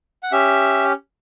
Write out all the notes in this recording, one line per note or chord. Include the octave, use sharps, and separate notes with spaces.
F#5
C#4 G4 E5